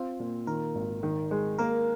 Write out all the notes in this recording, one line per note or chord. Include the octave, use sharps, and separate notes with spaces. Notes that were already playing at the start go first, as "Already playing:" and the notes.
Already playing: C4 F4
A#2
D#3 A#4
G#1
D#3
G#3
A#3 A#4